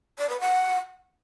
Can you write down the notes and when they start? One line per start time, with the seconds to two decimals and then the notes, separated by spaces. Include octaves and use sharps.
0.19 D5
0.29 B4
0.40 F#5